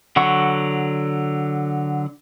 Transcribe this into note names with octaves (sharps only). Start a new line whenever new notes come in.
D3 F#3 F#5 C#6